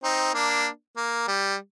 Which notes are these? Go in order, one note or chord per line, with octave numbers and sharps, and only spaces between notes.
C4 D#4
A#3 D4
A#3
G3